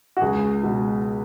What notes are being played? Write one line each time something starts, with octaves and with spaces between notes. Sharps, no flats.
F#4
C#2 G#4
B2 G#3